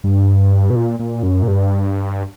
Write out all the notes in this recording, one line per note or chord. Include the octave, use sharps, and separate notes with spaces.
G2
B2
A#2
A#2
F#2
A#2
G2